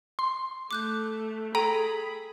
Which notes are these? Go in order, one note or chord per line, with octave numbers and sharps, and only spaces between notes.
C6
A3 D6 F#6 G6
G#4 A4 G5 A#5 B5 D#7